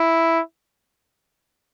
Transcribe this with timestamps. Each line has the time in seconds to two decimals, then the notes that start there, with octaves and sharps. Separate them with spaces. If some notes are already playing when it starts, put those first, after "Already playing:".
Already playing: E4